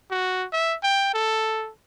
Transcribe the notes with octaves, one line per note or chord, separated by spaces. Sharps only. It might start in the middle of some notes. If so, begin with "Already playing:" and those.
F#4
E5
G5
A4